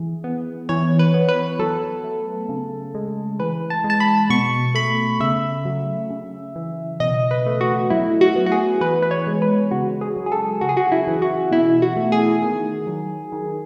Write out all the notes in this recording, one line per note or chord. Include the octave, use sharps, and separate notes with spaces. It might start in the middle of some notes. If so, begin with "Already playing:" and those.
Already playing: E3 G#4
B3
E3 C#5
B4
B3
B4
F#3 A4
A3
C#3
G#3
E3 B4
A5
G#3
A5
B5
B2 C#6
A3 B5
C#3 E5
F#3
C#3
E3
B2 D#5
B4
A3
F#4
F#3 E4
F#4
B3
F#4
G#4
E3 B4
B4
C#5
G#3
B4
C#3 F#4
G#4
F#3
G#4
A4
C#3 F#4
G#4
F#4
E4
E3
F#4
B2 E4
F#4
A3
G#4
D#3
F#3
D#3